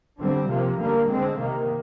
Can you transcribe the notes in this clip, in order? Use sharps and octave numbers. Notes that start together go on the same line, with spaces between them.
D3 G3 C4
C3 F3 A#3
D3 G3 A#3
D3 G#3 C4
C3 D#3 A#3